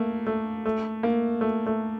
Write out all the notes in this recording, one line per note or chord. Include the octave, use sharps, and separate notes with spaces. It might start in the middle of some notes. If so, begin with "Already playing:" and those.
Already playing: A3 A#3
A3
A3
A#3
A3
A3